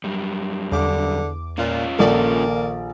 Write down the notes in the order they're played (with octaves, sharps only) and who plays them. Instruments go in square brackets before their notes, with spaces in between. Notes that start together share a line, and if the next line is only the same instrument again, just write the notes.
[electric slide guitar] F#2 G3
[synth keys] E2 D6 [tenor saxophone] D3
[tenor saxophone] A#2 [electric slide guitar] C#4 F4
[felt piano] A#1 A4 [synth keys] D#3 D5 [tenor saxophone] A#3